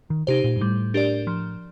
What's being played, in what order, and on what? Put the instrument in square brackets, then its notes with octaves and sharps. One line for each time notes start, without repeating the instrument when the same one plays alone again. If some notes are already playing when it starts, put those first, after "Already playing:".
[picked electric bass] D#3
[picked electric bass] C3 [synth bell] D#4 G4 C5
[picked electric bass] A#2
G2
[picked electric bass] A2 [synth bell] G3
[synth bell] D4 G4 A#4 D5
F3